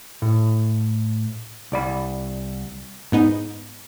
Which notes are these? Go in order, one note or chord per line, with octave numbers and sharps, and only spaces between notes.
A2
C2 D5 B5
G#2 B3 D#4